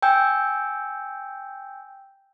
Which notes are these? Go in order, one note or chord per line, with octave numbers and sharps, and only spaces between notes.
G5 G#5 E6 G6